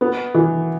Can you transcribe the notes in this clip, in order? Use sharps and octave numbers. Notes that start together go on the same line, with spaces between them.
B3
E3